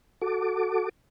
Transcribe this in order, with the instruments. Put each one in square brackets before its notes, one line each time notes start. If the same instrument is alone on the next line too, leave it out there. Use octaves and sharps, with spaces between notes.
[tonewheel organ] F#4 A4 D6